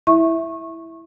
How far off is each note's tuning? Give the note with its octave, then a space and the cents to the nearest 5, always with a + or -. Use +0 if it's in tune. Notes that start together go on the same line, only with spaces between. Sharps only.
E4 +0 E5 -5 C#6 -20